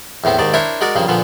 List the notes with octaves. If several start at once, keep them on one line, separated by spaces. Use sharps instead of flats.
E2 A2 B3 C4
D#2 G#2 D#3 D5
D4 E4 A#4 C5 C#5 E5
G#3 F#4 A#4 D5
G2 C#3 F3 A#3
A#2 D3 F3 B3